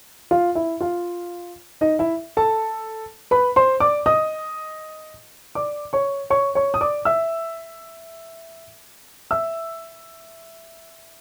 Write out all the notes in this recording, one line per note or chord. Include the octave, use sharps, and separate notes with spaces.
F4 F5
E4 E5
F4 F5
D#4 D#5
E4 E5
A4 A5
B4 B5
C5 C6
D5 D6
D#5 D#6
D5 D6
C#5 C#6
C#5 C#6
C#5 C#6
D#6
D5 D6
E5 E6
E5 E6